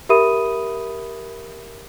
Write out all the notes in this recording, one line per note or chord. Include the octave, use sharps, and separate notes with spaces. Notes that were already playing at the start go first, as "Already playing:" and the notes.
G4 A#4 E5 B5 D#6 D#7